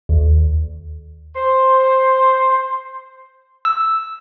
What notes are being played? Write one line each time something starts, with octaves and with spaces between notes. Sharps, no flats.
D#2
C5
E6